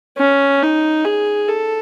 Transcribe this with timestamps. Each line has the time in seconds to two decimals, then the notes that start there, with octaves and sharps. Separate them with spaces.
0.18 C#4
0.62 D#4
1.04 G#4
1.49 A4